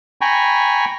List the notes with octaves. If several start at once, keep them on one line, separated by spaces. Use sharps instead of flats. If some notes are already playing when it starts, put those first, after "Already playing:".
G5 G#5 A#5 B5 C#6